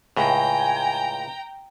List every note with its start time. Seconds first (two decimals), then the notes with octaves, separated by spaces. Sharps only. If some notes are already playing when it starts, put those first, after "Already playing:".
0.17 C#2 A2 G5 G#5 A#5